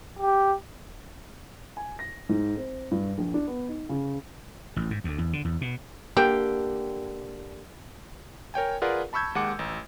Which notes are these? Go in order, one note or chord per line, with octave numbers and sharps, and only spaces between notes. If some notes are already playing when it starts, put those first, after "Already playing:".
G4
G#5
A#6
G#2
C4
G2
A#1
D4
B3
D#4
C#3
A1
G#2
D2
E2
D3
E2
B2
D3 A#3 G4 G5
A#4 C#5 G5 G#5
F4 G#4 A#4 B4 D5 F#5
A5 B5 C#6 E6 G6 G#6
D#2 G#3 F#5 D6 C#7
A1